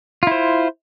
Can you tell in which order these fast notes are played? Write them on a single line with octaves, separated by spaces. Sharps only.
F4 E4 C5